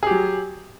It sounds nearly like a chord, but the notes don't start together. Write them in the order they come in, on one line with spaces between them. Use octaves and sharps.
G#4 G4 F#3